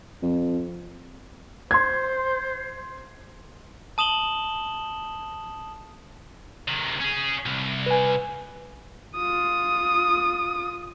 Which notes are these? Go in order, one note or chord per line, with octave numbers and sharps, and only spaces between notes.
F2
C5 C6 G#6
A5 D#6 E7 F#7 G7
C3 D#3
C#4 G#4
C2
B4 G#5
F4 D#6